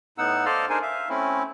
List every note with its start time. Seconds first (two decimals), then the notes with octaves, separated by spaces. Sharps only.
0.18 A2 B3 D#4 F#5 E6
0.46 A4 C5 D5 D#5 F5 F6
0.69 D4 D#4 G#4 A#4 C5 G#5
0.82 E5 F5
1.09 A3 C4 C#4 E4